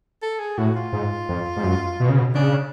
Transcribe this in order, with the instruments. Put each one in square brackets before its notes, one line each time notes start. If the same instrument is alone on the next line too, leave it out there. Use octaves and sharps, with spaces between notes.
[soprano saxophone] A4
G#4
[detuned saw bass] A2 [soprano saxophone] F#4
[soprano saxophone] F4
[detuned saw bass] G#2
F2
G#2
F#2
B2
C#3
B2
[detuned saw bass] C#3 [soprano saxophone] D4